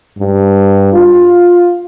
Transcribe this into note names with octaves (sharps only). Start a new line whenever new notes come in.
G2
F4